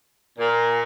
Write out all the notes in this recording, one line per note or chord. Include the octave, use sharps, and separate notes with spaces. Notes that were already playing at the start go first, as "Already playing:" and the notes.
A#2